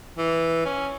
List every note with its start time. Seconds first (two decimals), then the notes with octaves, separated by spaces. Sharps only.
0.18 E3
0.65 C#4